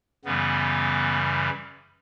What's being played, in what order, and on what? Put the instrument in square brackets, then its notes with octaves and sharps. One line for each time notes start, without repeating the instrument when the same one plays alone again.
[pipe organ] F#2 C#3 E3 G3 B3